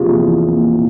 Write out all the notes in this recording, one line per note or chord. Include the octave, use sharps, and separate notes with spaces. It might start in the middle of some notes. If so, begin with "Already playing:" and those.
Already playing: E2 C3 F3 A#3 F4 G4 G#4
E2
A#3
A#2